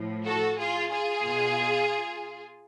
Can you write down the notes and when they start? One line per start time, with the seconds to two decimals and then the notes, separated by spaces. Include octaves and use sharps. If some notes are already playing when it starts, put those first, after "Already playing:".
Already playing: A2 F3
0.25 F#4 A4
0.59 F4 G#4
0.92 F4 G#4
1.25 B2